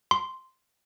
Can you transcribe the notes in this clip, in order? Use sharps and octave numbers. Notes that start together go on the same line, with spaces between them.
C6